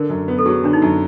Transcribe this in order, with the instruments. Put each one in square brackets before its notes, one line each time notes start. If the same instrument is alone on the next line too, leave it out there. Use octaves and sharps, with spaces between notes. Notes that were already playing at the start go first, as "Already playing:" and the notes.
Already playing: [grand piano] D3 [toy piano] A#4
[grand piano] F#2
B3
[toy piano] A4
[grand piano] F#3 [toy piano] G#4
[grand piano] D3 [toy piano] D4
[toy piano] D#4
[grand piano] F#2